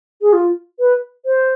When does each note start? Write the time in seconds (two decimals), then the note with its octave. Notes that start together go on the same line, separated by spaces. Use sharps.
0.22 G#4
0.33 F4
0.79 B4
1.26 C5